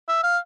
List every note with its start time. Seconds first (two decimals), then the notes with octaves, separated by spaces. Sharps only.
0.09 E5
0.24 F5